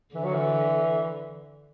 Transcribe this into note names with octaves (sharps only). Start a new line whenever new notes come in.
D3 E3
F#3
E3